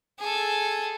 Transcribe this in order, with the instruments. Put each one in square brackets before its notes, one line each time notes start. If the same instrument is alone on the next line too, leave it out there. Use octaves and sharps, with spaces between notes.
[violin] G#4 A4